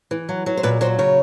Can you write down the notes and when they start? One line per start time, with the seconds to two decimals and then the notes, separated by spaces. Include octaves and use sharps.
0.11 E3
0.29 F#3
0.46 F#3
0.57 C5
0.63 A#2 B4
0.81 F#3 C5
0.99 C#3 C#5